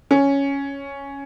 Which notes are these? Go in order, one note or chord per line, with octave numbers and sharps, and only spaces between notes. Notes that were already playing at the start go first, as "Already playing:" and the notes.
C#4